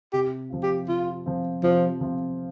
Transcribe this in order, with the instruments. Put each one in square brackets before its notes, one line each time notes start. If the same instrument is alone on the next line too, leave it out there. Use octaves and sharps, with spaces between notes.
[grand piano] C3 [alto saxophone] G4
[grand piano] F3 C4 F4
[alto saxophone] G4
[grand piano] C3 [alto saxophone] F4
[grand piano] F3 C4 F4
[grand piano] C3 [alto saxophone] F3
[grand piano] F3 C4 F4